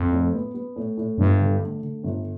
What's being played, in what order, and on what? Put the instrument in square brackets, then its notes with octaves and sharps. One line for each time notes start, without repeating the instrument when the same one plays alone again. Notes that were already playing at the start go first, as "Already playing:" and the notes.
Already playing: [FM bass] F2
[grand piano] A2
B3
B3
A2
A2
[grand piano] G1 [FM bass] G2
[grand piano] D3
A3
D3
G1